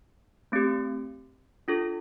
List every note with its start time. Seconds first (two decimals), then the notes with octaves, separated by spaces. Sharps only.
0.52 A3 C4 G4
1.68 D4 F4 A4